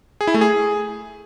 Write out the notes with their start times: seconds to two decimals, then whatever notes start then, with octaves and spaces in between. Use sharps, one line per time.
0.21 G#4
0.27 E4
0.34 A3
0.41 G#4